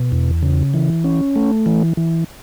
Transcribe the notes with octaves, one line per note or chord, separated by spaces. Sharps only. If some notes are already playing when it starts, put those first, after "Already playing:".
Already playing: B2
E2
C#3
E3
C#4
A3
E3
E3